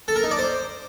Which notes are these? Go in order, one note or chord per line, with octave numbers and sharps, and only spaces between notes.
A4
A#4
D#4
D5
C5